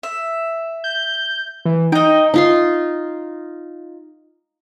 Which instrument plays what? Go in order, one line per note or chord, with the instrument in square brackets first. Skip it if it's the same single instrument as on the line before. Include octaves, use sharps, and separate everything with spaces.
[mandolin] E5
[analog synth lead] G6
E3
[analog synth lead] D#4 [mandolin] D#5 G5
[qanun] D#4 F4 C6